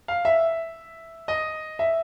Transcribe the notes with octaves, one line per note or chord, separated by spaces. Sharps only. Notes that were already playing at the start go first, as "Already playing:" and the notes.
F5
E5
D#5
E5